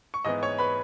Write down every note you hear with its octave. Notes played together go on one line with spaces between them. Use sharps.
C#6
G#2 E3 B3 D#5 D#6
C#5 C#6
B4 B5